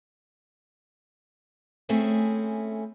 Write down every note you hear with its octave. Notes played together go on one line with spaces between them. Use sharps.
A3 C4 C#4 E4 G#4